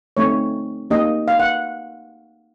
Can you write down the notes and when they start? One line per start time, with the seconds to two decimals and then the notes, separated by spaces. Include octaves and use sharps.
0.17 A3 C4 D#4 C#5
0.90 A#3 D#4 G4 D#5
1.28 F5
1.40 F#5